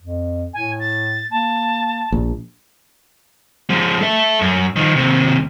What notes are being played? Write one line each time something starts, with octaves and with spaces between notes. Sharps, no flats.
F2
A2 G#5
A6
A#3 A5
A#1
F3 G#3
A4 E5
F#2
D#3 F3
D#2 C3